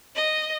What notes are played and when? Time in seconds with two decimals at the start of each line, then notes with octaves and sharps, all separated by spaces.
0.16 D#5